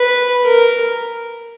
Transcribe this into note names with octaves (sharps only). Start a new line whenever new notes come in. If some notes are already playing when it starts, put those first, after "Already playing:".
Already playing: B4
A#4